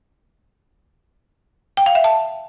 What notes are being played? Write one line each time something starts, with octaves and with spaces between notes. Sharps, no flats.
G5
F5
E5
A5